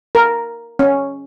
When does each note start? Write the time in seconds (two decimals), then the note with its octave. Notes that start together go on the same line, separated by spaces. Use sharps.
0.15 A#4
0.79 C#4